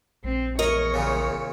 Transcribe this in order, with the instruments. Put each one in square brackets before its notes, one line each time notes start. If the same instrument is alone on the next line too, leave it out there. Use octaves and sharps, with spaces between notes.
[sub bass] A#1 [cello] C4
[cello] E2 C#5 [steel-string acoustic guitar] A#4 D#5
[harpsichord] A#2 C#3